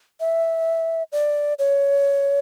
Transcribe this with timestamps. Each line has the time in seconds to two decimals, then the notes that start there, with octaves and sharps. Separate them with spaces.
0.20 E5
1.12 D5
1.59 C#5